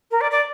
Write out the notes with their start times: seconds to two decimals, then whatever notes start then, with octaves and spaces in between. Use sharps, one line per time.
0.11 A#4
0.21 D5
0.31 D5